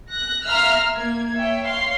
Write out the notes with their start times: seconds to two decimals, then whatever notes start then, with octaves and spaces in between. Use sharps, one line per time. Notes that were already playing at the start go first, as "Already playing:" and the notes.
0.11 F#6 A#6
0.47 E5 F5 A#5 C6 E6 F6
0.90 A#3 G#6
1.36 C#5 E5 G5
1.66 C#5 F5 C6